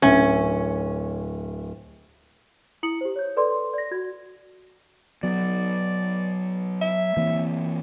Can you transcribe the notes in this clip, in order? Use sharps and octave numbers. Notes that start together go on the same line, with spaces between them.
D1 C#4 E5 G#6
E4 D#6 C#7 F#7
G4 C5
C#5 G6
A4 B4 D5 C6
D5 A#6
F#4 G#6
F#3 B3 D5
E5
E3 A#3 C4